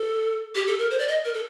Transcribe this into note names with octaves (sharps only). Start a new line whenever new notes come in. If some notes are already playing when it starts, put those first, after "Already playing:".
Already playing: A4
G4
A4
A#4
C5
D5
D#5
A#4
A4